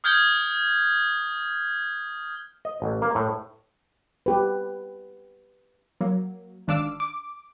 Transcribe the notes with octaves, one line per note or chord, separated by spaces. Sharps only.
D#6 F6 G6 G#6 G7
D#5
A1
A#3
A2
G4 B4
F#3 A#3
G#1 D#3 D4 F5 D6 E6
D6